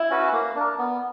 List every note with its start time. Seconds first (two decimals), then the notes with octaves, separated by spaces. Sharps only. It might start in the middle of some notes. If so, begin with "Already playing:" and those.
Already playing: E4
0.10 C#4 F#4 B4
0.33 A#3
0.56 D4 A#4
0.78 B3